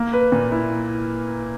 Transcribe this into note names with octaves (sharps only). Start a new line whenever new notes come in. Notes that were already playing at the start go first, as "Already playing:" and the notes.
Already playing: A#3
B4
A#2
E4